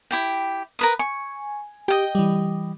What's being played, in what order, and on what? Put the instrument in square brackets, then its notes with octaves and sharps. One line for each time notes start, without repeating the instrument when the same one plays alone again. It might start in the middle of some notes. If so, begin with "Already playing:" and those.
[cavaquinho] E4 G4 G5
A#4 B4 D#6
[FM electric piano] G#5 [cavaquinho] C#6
[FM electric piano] G4 [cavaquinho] D#5 G5
[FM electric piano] E3 G3